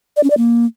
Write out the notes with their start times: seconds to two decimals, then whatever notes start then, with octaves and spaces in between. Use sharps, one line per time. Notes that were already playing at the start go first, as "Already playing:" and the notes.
0.16 D5
0.23 C#4
0.30 D5
0.37 A#3